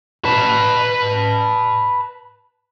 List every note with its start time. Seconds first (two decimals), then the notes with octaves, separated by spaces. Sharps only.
0.25 B4 A5